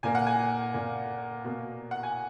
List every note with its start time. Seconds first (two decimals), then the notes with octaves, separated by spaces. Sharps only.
0.03 A#2 A#3 G#5
0.15 F#5
0.27 G#5
0.74 A#2 A#3
1.44 B2 A#3
1.91 F#5
2.03 G#5